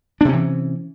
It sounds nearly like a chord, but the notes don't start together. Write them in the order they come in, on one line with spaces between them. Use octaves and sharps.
D4 C3 C#4 E3